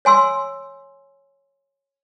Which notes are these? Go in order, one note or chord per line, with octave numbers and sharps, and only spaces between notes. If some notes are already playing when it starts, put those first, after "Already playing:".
C#5 G#5 C6 E6